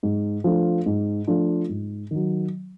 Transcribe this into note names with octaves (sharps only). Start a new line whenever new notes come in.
G#2
F3 A3 D4 F4
G#2
F3 A3 D4 F4
G#2
D#3 F#3